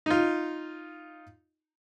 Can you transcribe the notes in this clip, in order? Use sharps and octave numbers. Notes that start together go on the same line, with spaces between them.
D#4 F4